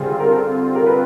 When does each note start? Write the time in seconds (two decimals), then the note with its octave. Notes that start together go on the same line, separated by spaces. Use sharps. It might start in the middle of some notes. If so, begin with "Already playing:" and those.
Already playing: D3 G3 C4 F4 G#4
0.20 A#4
0.31 A4
0.75 A#4
0.86 B4